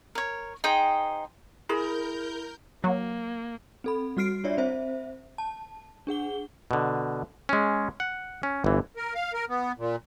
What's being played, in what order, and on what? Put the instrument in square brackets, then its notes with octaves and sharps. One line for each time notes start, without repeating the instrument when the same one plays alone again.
[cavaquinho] A#4 C#5
D#4 G#4 C5 G5
[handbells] E4 [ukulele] G#4 B5 [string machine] A#4 G6
[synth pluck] F#3 [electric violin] A#3
[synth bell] C4 A4 B5
G3 F#4 F6 C7 D7
D4 F4 C#5 D5 E5
C4 C5 E5
A5
D4 G#4 F#5 G7
[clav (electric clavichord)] B2 D3
G#3 C#4
F#5
C#4
G1 E3
[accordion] A#4
F5
A#4
B3
A#2